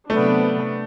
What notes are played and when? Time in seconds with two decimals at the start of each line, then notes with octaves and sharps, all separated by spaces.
0.10 C3 F#3 A3 B3 D4